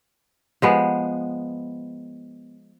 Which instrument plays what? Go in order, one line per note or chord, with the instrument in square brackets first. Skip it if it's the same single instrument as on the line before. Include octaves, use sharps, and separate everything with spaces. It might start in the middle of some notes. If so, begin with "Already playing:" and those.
[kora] F3 G#3 B3